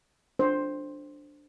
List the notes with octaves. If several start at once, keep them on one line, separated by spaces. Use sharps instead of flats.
D4 C5